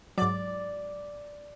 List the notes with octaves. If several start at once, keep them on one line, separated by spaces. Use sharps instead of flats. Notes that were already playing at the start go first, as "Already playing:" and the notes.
G#2 F#3 D5